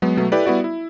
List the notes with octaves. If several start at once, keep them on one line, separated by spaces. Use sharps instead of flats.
F#3 G#3 B3
B2 F#3 A3 B3
E4 G4 A4 B4 D5
G3 B3 E4 F#4 D5
E4